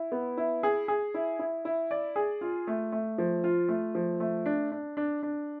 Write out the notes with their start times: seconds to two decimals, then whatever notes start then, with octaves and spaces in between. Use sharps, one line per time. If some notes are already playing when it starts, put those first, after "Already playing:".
Already playing: E4
0.12 B3
0.38 E4
0.63 G#4
0.88 G#4
1.14 E4
1.39 E4
1.65 E4
1.91 D5
2.16 G#4
2.41 F4
2.67 A3
2.92 A3
3.18 F3
3.44 F4
3.69 A3
3.95 F3
4.20 A3
4.46 D4
4.72 D4
4.97 D4
5.23 D4